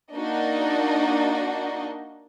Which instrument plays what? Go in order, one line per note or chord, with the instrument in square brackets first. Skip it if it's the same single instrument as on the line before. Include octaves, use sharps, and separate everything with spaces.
[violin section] A#3 D4 D#4 F#4 D#5